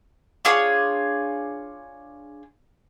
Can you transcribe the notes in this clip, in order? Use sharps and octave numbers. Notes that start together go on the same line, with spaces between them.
D4 F4 G#4 C#5